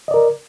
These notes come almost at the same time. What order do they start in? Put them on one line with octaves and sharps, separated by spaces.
D#5 D5 A#4